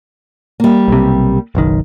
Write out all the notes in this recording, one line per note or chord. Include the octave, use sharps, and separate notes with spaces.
G3 A#3
B1 C3
F#1 B1 D#3